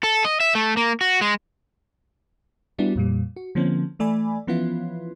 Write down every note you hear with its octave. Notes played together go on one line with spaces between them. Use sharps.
A4
D#5
E5
A3
A#3
F#4
G#3
G3 B3 D4 E4 F#4
F2 A#2 G3
F#4
D3 F3 A#3 C4 C#4
E3 A3 D5 G#5 B5
E3 F3 B3 C#4 E4 F4